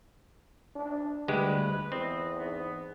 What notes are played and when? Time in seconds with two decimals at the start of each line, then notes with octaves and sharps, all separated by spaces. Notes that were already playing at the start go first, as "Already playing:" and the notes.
0.76 D4
1.28 D2 G3 G#3 G4 B4
1.92 E2 C4 B4 D#5
2.39 G#2 B3